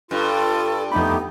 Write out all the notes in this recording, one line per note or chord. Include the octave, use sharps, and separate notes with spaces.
G2 F4 A4
F2 A3 B3 D#4 G4 B5